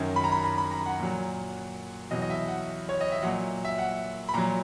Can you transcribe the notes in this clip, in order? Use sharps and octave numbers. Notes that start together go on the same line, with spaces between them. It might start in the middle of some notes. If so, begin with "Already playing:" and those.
Already playing: F#2 D#3 F#3
B5
A#5
B5
B5
B5
A#5
F#5
A#2 F#3
E2 B2 F#3 D#5
D#5
E5
F#5
C#5
D#5
E5
A#2 F#3 F#5
E5
F#5
B5
A#2 F#3 A#5